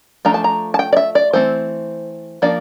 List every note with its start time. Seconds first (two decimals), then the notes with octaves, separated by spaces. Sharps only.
0.25 F3 A3 D4 A#5
0.34 A5
0.44 A#5
0.74 A5
0.79 G5
0.93 D5
0.97 E5
1.15 D5
1.33 E3 A3 C4 C5
2.42 F3 A#3 D4 D5